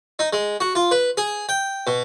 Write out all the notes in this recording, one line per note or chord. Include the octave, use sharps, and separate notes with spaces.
D#4
G#3
F#4
F4
B4
G#4
G5
B2